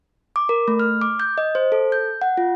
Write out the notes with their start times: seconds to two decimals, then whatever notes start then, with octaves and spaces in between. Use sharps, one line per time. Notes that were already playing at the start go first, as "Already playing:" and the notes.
0.36 D6
0.49 A#4
0.68 A3
0.79 F6
1.02 D6
1.20 G6
1.38 D#5
1.55 C5
1.72 A4
1.92 G6
2.22 F#5
2.37 F4